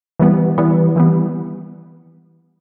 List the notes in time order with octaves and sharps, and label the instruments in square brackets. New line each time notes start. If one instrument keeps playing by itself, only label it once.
[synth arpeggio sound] E3 G3 B3
E3 G3 B3
E3 G3 B3